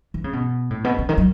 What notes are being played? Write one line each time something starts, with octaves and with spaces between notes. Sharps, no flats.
E3
C#3
B2
A2
B2
C#3
D#3
F#3